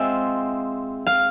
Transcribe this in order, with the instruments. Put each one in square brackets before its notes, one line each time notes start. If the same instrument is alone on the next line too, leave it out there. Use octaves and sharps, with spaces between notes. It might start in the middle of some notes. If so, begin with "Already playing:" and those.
Already playing: [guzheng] G#3 C4 F4 [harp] E5
[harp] F5